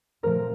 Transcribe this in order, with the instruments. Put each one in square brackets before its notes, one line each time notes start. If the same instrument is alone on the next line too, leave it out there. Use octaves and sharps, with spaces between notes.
[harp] A#2 F3 A3 C4 A#4